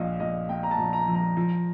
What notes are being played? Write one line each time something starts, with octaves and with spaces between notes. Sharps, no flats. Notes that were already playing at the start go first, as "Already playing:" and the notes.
Already playing: A#1 A#2 D#5 F5
A#1 D#5
A#2 G5
A#5
A5
A#1
A#5
F3
A#5
F3